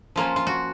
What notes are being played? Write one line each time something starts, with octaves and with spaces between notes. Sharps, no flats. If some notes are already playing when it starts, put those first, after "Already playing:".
F3 A#3 C#4 F4
F4
F#4